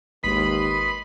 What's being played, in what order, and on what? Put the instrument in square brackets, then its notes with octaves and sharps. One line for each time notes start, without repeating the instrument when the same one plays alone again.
[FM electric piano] G#1 G#3 [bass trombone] D#2 [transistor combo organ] B4 D#5 C6 [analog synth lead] B5